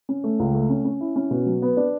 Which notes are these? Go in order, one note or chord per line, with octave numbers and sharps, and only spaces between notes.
C#4
A3
C#2
A3
C#4
C#4
E4
C#4
B2
F#3
B3
D4